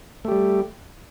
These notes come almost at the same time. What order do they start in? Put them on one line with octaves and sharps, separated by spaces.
A3 G4 G3